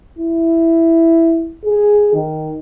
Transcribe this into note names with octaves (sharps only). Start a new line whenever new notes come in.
E4
G#4
D#3